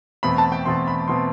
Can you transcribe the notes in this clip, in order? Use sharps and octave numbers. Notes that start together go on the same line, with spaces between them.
E2 B2 A3 C4 B5
A5
G5
E2 B2 A3 C4 C6
B5
B2 A3 C4 C6